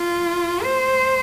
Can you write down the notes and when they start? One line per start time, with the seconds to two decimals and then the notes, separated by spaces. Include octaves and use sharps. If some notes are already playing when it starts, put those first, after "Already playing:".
Already playing: F4
0.63 C5